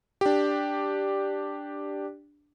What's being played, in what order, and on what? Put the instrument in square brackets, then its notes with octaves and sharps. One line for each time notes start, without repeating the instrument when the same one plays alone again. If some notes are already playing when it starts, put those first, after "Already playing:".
[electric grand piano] D4 G4